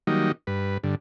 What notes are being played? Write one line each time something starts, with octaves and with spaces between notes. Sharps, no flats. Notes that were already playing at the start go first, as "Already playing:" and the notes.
D#3 F#3 G3 A#3 D#4
G2 B4
G2 D3